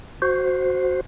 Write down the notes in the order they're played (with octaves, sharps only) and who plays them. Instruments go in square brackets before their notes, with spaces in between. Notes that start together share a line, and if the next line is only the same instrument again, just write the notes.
[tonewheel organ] F#4 C5